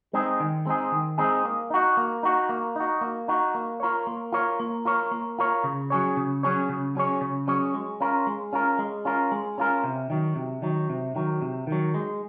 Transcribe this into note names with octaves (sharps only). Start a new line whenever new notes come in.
G#3 C4 D#4 G#4
D#3
G#3 C4 D#4 G#4
D#3
G#3 C4 D#4 G#4
A#3
D#4 F#4
A#3
D#4 F#4
A#3
D#4 F#4
A#3
D#4 F#4
A#3
F4 A#4 C#5
A#3
F4 A#4 C#5
A#3
F4 A#4 C#5
A#3
F4 A#4 C#5
C#3
F#3 C#4 G#4 C#5
C#3
F#3 C#4 G#4 C#5
C#3
F#3 C#4 G#4 C#5
C#3
F#3 C#4 G#4 C#5
G#3
C#4 F4 A#4
G#3
C#4 F4 A#4
G#3
C#4 F4 A#4
G#3
C#4 F4 A#4
C3
D#3 F#3
C3
D#3 F#3
C3
D#3 F#3
C3
D#3 F#3
G#3